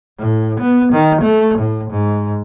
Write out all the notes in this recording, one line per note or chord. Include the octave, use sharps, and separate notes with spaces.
A2
B3
D#3
A3
A2
G#2